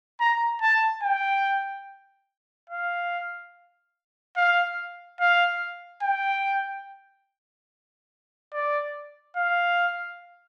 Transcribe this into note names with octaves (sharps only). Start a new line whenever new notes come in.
A#5
A5
G5
F5
F5
F5
G5
D5
F5